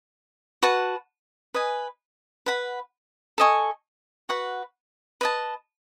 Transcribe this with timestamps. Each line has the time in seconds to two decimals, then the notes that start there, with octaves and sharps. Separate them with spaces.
0.63 F#4 B4 F#5 A5
1.54 B4 D#5 G#5
2.46 B4 F#5 B5
3.38 A4 D#5 G#5 C#6
4.29 F#4 B4 F#5 C#6
5.21 B4 D#5 A5